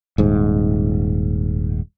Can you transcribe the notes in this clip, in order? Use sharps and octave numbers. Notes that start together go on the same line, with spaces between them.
D#1 G#2